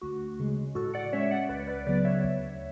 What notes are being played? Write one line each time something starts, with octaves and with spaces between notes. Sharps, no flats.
D2 F#4
C#3 G#3
A2 F#4 A4
D5 F#5
G#3 C#4 C#5 E5
D5 F#5
C#2 B4 D5
B4 D5
C#3 F#3 B3 B4 D5
C#5 E5
D2